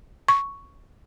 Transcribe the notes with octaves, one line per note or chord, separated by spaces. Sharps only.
C#6